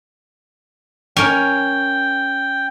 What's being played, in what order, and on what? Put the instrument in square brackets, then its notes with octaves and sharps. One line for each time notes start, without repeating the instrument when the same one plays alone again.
[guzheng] C#4 A#4 [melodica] G5